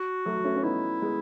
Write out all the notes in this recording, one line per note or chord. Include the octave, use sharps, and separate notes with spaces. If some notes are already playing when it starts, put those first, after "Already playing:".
Already playing: F#4
F#3 A3
A3 C#4
C#4
B3 D#4 E4
G#3 B3